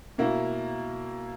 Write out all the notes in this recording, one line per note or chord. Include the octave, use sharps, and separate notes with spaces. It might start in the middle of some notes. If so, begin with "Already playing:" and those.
B2 A#3 E4